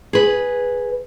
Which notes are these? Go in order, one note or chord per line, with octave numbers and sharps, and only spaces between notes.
G#4 B4